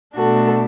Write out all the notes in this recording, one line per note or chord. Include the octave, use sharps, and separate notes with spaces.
B2 A3 D4 F#4 A4